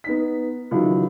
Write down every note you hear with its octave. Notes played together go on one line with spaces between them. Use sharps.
B3 D#4 B6
C#2 D#3 E3 F#3